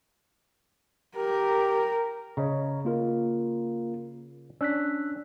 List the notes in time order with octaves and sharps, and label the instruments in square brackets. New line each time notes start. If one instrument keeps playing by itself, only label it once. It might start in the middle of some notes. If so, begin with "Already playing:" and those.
[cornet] G4 [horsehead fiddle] A#4
[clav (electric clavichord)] C#3 [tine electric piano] C#5 D#5 A#5
[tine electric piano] A#3 F4 A#4
[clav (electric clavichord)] C#4 D4 [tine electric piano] E6 F#6 B6